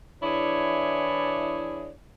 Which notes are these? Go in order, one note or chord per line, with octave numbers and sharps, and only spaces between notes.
E3 D4 E4 G#4 C#5 D5